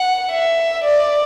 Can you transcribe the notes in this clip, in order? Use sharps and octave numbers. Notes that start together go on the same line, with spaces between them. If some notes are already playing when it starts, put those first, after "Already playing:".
Already playing: F#5
E5
D5